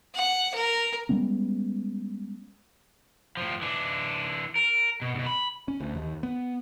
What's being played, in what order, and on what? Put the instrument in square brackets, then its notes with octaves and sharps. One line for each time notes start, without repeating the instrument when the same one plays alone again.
[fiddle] F#5
A#4
[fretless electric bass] G3 G#3 B3 C#4
[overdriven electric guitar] A2 F3
E3 D4
A#4
B2
D2 B2
B5
[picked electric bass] C#4
D2
D#2
B3